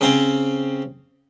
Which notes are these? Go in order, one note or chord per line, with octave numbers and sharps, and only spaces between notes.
C#3 C4 C#4